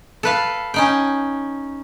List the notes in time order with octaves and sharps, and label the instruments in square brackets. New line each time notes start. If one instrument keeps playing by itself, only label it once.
[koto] A4 B4 F5
C#4 D#4 G5